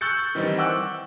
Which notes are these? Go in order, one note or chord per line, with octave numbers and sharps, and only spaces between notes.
C#6 E6 F#6 G6 A6 C#7
D#3 E3 G3 C4 D#4
F#5 G5 C#6 D6 E6 F#6